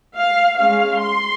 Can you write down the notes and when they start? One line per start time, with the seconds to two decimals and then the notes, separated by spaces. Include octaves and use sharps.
0.16 F5
0.59 G#3 C#4 F5
1.02 C6